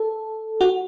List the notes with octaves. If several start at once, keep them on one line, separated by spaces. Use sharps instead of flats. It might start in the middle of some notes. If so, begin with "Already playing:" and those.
Already playing: A4
F#4